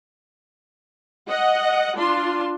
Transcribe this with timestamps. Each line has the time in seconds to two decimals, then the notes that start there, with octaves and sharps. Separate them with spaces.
1.29 D#5 F#5
1.97 D4 F4 C6